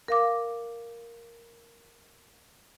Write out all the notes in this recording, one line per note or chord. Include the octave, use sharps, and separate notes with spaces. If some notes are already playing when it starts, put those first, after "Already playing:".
A#4 F5 D6